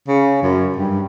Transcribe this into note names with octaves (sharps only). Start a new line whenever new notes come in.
C#3
F#2
G2